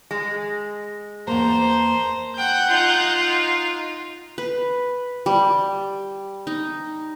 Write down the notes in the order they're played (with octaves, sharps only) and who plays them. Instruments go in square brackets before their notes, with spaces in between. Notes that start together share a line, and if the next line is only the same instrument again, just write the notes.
[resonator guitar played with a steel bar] G#3
[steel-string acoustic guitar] E2 A#3 [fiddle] C5 [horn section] A5 A#5 C6
[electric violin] F#5 G6 [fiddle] G5
[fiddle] D#4 F4
[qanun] B4
G3
D#4